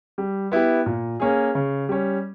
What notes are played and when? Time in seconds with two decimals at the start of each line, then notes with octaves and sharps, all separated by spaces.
0.18 G3
0.51 B3 E4 G4
0.86 A#2
1.20 A#3 C#4 G#4
1.55 C#3
1.89 G3 C#4